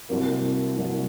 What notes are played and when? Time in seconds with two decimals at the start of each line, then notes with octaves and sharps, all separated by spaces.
0.09 C2 C3 F#3 A#3
0.77 C2 C3 F#3 A#3